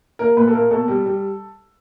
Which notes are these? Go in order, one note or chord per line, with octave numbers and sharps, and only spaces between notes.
A#3 A#4
A#2 B4
A4
A#3 A#4
B2 A4
G3
G3